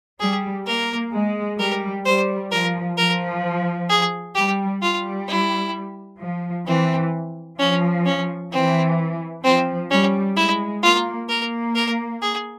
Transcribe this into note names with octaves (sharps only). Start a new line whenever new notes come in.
G3 G#4
A#3 A#4
G#3
G3 A#4
G3 C5
F3 A#4
F3 A#4
G#4
G3 G4
G3 F4
E4
F3
E3 C4
F3 C#4
C#4
E3 C4
F3 C4
G3 C#4
G#3 E4
A#3 F4
A#3 A#4
A#4
G#4